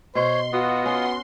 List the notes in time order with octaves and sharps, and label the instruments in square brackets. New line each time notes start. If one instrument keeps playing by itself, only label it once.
[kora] B2 [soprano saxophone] C5 [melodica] C#5 [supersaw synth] C6
[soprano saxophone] B3 [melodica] F4 D#5 [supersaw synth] F#4
[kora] C#4 [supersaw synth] C6